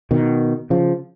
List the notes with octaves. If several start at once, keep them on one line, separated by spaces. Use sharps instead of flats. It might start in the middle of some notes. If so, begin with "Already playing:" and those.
B2 D#3
C#3 F3